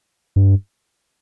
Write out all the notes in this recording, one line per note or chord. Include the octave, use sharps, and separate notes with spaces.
G2